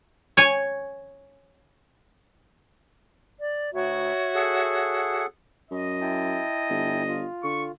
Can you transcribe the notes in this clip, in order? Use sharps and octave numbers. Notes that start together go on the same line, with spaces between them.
C#5 G#5
D5
D2 F#4 C#5 E5
G#4 A4 F#5
F#2 D#5
E4 G5 A5
G1
F4
D3 C#6